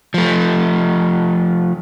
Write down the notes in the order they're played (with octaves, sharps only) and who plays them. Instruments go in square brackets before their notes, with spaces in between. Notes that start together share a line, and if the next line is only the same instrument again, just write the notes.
[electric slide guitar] F3 A3